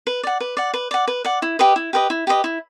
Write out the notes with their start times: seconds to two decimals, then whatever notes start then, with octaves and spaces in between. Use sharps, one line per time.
0.07 B4
0.23 D5 F#5
0.40 B4
0.57 D5 F#5
0.74 B4
0.91 D5 F#5
1.07 B4
1.25 D5 F#5
1.42 E4
1.59 G4 B4 D#5
1.76 E4
1.93 G4 B4 D#5
2.10 E4
2.27 G4 B4 D#5
2.44 E4